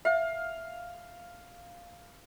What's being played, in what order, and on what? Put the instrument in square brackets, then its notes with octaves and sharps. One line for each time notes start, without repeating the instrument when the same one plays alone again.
[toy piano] E5 [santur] F5